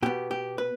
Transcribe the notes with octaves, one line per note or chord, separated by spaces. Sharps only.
B2 B3 G4
G4
B4